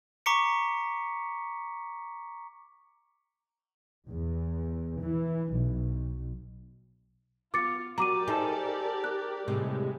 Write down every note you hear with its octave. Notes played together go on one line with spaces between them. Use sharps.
A#5 C#6 D6 B6 C#7
E2
E3
B1
B3 F4 D6 A6 C#7
F#3 F#4 G4 A#4 D5 A#5 D6 D#7
D#4 G#4 A4 C5
F#6
D#2 A2 C3 G3 G#3